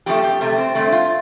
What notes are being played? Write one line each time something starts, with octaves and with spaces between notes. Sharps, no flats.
F2 F3 A3 G4
G4
C3 A3 C4
C4
G2 D3 A3 C4
F4